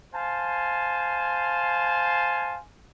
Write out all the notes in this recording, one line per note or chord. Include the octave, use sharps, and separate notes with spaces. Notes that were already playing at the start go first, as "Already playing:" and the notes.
C5 F5 G#5 A5